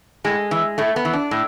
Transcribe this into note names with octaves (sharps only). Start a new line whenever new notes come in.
A2 G#3
E3
A2 A3
B3
E3
D4
A2